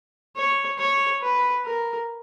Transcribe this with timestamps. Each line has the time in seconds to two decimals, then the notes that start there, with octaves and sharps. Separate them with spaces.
0.36 C#5
0.78 C#5
1.22 B4
1.65 A#4